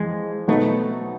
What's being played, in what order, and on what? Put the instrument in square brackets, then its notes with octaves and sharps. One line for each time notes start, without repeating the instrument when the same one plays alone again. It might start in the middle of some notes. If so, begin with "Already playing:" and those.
Already playing: [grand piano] F2 E3 [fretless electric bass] G#3
[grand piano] B2 F#3 B3 D#4 [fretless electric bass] A3